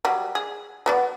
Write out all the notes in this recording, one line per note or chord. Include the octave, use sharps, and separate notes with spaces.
F#3 G3
G#4
F#3 B3 D5